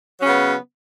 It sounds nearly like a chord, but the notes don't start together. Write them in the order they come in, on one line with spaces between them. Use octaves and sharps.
F#3 C#4 C#3 B3